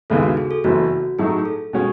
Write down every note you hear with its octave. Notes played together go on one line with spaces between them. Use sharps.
D#2 C#3 G#3 B3 E4 A4
F#4
G#4
A4
F#1 F#2 E3 B3 F#4
A2 F#3 A3 D#4 G#4
A4
B2 G#3 C#4 F#4